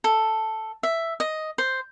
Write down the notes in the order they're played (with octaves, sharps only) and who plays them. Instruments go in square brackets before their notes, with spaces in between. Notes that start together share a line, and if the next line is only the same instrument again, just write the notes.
[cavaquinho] A4
E5
D#5
C5